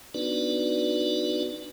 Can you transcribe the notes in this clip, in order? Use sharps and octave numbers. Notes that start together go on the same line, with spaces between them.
B3 D4 D#4 F#4 B4 D5